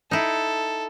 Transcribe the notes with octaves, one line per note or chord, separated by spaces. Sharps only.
D#4 E4 A4